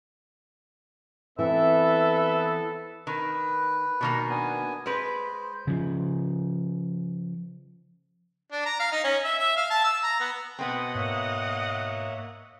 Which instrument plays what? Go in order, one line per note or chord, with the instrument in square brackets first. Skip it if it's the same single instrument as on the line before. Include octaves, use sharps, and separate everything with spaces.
[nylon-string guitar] E3 C4 [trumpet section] B3 A4 B4 [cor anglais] E5
[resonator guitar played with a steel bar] D#3 [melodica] B4
[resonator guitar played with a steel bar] B2 D#3 A#3
[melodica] B3 D4 G#5
[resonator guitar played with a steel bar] G#3 B4 [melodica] C5
[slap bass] C#3 F3
[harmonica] D4
A#5
F5
D#4
C#4
E5
E5
F5
A5
E6
A#5
B3
[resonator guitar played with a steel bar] B2 B3 C4 [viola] D#5 F#5
[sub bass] G#2 [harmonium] A#3 C#5 E5